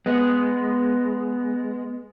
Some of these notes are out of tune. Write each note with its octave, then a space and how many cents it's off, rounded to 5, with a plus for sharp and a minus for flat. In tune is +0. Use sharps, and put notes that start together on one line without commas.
G#3 +0 B3 +0